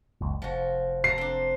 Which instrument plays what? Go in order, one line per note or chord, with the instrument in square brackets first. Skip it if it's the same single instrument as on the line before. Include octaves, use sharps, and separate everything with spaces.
[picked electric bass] F#1 C#2
[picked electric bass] F1 [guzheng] F3 F#4
[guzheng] A5 A#5 [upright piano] C7
[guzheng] C4 D4